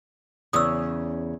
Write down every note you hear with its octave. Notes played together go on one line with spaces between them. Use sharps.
E2 C#3 D#6 E6